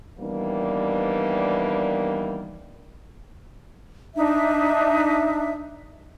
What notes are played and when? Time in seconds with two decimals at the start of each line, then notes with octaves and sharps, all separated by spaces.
0.19 D#3 E3 G3 A#3 B3 D4
4.16 D4 D#4 E5